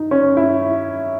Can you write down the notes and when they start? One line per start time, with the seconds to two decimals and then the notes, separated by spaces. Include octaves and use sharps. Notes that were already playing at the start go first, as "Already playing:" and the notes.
Already playing: D#4
0.11 C#4
0.37 E4